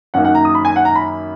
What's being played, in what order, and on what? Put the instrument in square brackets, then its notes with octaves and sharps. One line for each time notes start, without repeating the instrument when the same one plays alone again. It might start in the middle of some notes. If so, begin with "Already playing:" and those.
[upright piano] F#2 D#3 A#3 D#4 F#5
F#5
A#5
D#6
B5
G#5
F#5
A#5
B5